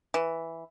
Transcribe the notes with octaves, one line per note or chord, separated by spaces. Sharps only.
E3